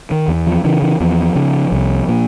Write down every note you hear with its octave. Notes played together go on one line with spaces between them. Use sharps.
D#3
E2
F3
C#3 E3
E3
E2 F3
C#3
C2
A#2